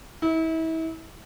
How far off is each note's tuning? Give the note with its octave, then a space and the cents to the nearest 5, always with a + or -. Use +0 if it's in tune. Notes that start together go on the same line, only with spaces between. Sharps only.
E4 -35